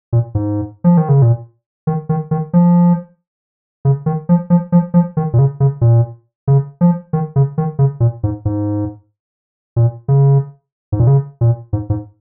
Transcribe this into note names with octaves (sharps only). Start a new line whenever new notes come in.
A#2
G#2
F3
D#3
C#3
A#2
D#3
D#3
D#3
F3
C#3
D#3
F3
F3
F3
F3
D#3
A#2
C#3
C#3
A#2
C#3
F3
D#3
C#3
D#3
C#3
A#2
G#2
G#2
A#2
C#3
G#2
A#2
C#3
A#2
G#2
G#2